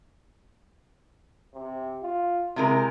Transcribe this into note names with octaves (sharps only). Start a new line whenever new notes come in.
C3
F4
C3 G#3 E4 A#4